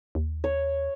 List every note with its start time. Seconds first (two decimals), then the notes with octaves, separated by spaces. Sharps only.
0.15 D#2
0.44 C#5